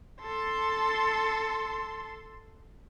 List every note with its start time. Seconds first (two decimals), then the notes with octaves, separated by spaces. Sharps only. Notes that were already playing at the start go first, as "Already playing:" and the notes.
0.22 A4 C6